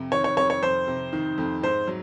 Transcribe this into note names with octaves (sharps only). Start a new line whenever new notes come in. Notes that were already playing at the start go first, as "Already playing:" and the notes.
Already playing: F2 C3
D#3 C#5
C#5
F2 C#5
C#5
F2 C5
C3
D#3
F2
G#2 C5
F#3